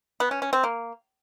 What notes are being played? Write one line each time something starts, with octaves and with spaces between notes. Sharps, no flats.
B3
C#4
C#4
C4
A#3